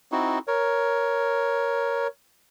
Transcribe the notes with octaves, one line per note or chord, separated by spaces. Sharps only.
C4 D#4 E4 F#4
A#4 C#5